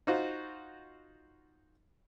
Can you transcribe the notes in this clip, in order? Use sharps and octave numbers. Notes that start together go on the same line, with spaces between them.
D#4 F4 F#4 C5